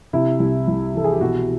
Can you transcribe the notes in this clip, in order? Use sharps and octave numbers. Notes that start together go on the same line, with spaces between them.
C3 E4
C2
C2
E3 A4
G#4
G4
B2 F#4